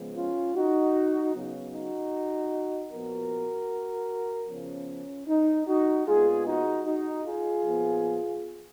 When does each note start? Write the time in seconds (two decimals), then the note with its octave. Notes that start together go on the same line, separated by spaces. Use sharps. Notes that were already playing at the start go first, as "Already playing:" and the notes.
Already playing: C#3 F3 G#3 B3
0.15 C#4 F4
0.55 D#4 F#4
1.34 C#3 F#3 B3
1.73 D#4 F#4
2.91 A#2 F3 B3 F#4 A#4
4.48 C#3 F3 B3 C#4
5.28 D#4
5.66 D#4 F#4
6.06 A#2 G#3 B3 F4 G#4
6.45 D#4 F#4
6.85 D#4 F#4
7.24 F4 G#4
7.63 A#2 F3 B3